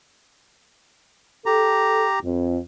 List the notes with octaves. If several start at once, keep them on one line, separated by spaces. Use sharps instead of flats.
G4 A4 A#5
F2